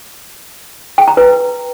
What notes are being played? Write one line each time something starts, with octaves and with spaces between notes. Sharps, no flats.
G5
A#5
B4